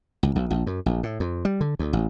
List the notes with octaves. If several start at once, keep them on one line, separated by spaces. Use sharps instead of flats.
C#2
B1
A#1
F#2
A#1
A2
F2
G3
D3
D2
A1